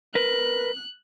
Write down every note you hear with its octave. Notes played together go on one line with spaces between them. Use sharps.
A#4 B4 F#6